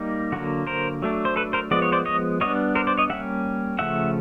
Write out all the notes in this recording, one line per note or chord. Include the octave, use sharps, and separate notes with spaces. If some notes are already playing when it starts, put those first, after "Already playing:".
Already playing: G3 A#3 D#4
D3 F#3 A#3 F#4
A#4 C5
F#3 A3 D4
C5
A4 B4
A#4 C5
F3 G#3 B3 D5
C#5
C5 D5
C#5 D#5
G3 B3 D4 C#5 D#5
A#4 C5
C5 D5
C#5 D#5
G3 A#3 C#4 E5 F#5
C#3 F3 A3 C#4 E5 F#5